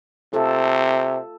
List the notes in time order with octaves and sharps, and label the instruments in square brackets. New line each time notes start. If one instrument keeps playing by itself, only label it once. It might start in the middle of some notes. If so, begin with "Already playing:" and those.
[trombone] C3 [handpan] F4 A4